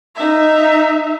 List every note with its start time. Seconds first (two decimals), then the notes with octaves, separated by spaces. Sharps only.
0.15 D#4 E5